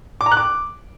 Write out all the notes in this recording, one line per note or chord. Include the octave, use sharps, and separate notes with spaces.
D6
A#5
F#6
D6